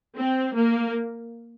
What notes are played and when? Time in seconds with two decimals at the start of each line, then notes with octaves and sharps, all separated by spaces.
0.16 C4
0.54 A#3